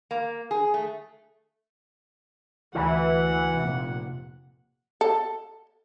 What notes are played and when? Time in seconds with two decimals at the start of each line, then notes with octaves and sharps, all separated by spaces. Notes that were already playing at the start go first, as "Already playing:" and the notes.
0.11 A#3
0.51 G#4
0.74 A3
2.75 D2 E3 F#5
3.57 F1 A#2
5.01 A4